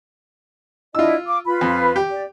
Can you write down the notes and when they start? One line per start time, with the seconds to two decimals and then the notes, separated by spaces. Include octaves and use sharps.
0.95 D4 E4 F4 D#5 E6
1.27 F5 D6
1.45 F4 B4 B5
1.61 F2
1.96 G4
2.09 D5